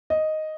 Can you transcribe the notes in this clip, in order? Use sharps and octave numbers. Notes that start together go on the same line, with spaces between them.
D#5